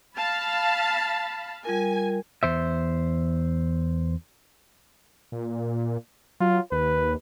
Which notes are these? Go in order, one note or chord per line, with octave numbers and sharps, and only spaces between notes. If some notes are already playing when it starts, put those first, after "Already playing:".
F5 A5 B5
G3 F4 A#4 G#5
E2 C5 E5
A#2
F#3 F4
D#2 B4